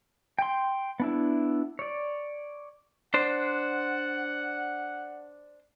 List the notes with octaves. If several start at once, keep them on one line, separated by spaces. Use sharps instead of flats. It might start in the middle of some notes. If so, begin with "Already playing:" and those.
G5 C6
B3 D4 E4
C#5 D5
D4 C5 F#5